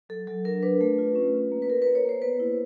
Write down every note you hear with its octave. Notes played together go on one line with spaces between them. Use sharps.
F#3 A4
F#3 A4
D4 A#4
D4 B4
A3
F4
C#4
F4
A#3
B4
A#3 A#4
A#3 B4
C#5
A#3 C5
B3 B4
E4